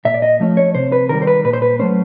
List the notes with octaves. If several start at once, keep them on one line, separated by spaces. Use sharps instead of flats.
A#2 E5
D5
D#5
F3 A3 C#4
C#5
C3 C5
B4
D#3 G3 A#4
C5
B4
A#2 B4
C5
B4
F#3 A3 C#4 C5